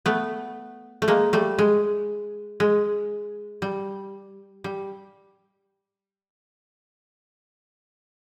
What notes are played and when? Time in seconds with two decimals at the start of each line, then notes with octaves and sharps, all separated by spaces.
0.06 A3 B3
1.02 A3
1.08 G#3 A#3
1.33 G3 A3
1.58 G#3
2.60 G#3
3.62 G3
4.64 G3